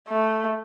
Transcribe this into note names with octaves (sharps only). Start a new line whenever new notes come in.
A3